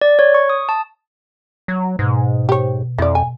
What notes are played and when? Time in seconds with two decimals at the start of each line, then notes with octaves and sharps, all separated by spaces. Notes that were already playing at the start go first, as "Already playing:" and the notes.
0.01 D5
0.19 C#5
0.34 C#6
0.50 D#6
0.69 A5
1.68 F#3
1.99 G#2 B2
2.49 G4 C#5
2.98 F2 E4 D5
3.15 G#5